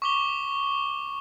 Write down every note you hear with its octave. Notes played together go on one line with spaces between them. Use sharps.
C#6 D6 G7